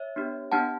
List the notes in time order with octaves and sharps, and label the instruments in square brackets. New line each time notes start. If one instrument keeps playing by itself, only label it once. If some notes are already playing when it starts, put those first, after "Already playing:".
Already playing: [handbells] C#5 E5
B3 D4 G4
B3 D4 G4 F#5 A5